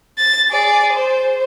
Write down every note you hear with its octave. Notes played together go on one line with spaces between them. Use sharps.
A6
G#4 D5
C5